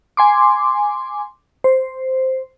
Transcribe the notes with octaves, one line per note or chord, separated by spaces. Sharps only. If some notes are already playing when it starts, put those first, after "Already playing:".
G#5 C6 D6
C5